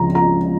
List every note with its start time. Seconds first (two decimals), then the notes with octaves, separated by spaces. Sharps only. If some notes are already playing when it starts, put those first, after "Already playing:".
Already playing: C#2 F3 A#5
0.15 A#5